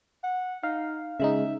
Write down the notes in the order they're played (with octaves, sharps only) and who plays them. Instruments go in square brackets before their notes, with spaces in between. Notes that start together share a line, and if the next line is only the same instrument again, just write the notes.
[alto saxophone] F#5
[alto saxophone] D#4 [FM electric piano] F5
[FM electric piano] C#3 G#3 D#4 [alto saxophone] E5